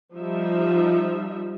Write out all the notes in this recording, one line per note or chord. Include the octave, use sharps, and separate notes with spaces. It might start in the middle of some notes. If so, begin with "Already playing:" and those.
F3 G3 D#4 E5